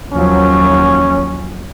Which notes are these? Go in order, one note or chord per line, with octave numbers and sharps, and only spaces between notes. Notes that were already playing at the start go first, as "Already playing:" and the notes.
D#2 F3 F#3 C#4